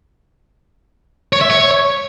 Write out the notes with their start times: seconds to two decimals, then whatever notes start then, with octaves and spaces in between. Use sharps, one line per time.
1.33 C#5
1.41 E5
1.50 C#5